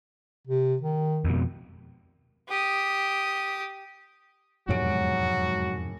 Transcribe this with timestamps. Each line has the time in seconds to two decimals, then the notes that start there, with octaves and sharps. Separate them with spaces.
0.47 C3
0.82 D#3
1.25 F2 B2
2.49 G4 D#6
4.69 E1 F2 G#2 C3 F#3 F#4 C#5 D7